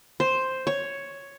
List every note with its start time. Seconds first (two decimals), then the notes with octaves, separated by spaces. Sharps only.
0.20 C5
0.67 C#5